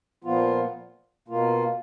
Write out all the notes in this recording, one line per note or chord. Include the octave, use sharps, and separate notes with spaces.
A#2 F3 B3 F4
B2 A#3 F4